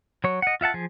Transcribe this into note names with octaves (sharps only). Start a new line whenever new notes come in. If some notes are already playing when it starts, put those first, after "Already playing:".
F#3 C#5
D#5 F#5
F4 E5 F#5 A5
F3 G#4